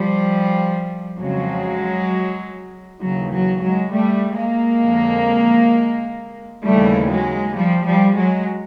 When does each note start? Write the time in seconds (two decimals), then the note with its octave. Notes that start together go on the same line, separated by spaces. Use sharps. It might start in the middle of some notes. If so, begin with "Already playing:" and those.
Already playing: F3 G3
1.18 F2 C#3 F3 F#3 G#3
3.01 D#2 C#3 E3 F#3
3.31 F#3
3.61 F#3 G#3
3.91 G3 A3
4.36 G#3 A#3
4.82 F2 D3 F3
6.64 D#2 C#3 E3 G3 A3
7.10 F#3 G#3
7.55 F3 G3
7.86 F3 G3
8.15 F#3 G#3